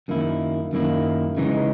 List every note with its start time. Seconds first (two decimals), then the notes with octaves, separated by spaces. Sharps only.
0.08 F#2 D#3 A#3 E4
0.73 F#2 D#3 A#3 E4
1.37 C#3 E3 G#3 D#4